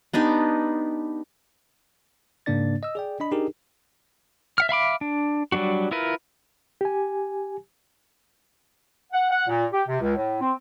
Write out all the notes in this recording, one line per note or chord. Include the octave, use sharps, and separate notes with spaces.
B3 D4 D#4 G4
G#2 C#3 A#3 D4 D5 A6
D#5 E6
G#4 D5 G5
D4 D#5 B5
D4 D#4 G4 G#4 A#4
E5 F#5 F6
E5 F5 B5 D6
D4
F#3 G3 A#3 D4 F#4
E4 F4 A#4 B4
G4 G#5
F#5
F#5
A#2
G4
C3
C#2
A2
C4